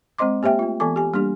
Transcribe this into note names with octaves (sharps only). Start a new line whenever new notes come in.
G#3 C4 C5 D#5 C6 D6
A#3 G4 C5 E5 G5
A3 F4
E3 B3 A4 G#5 D6
G4 G#5
G3 A#3 D4 G4